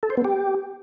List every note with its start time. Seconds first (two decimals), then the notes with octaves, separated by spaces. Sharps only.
0.03 A4
0.10 C5
0.17 B3
0.25 G4